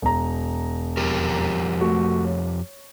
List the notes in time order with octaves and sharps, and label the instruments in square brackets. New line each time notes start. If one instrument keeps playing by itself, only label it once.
[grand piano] E1 A#5
[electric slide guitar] F2 G4 A#4
[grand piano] A3 F#4
C#5